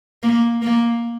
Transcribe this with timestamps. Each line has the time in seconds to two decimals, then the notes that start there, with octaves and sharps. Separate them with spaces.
0.23 A#3
0.62 A#3